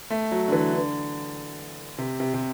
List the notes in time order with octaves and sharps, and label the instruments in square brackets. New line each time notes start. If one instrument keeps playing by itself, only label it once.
[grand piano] A3
F#3
D3
E3
D3
C3
C3
C3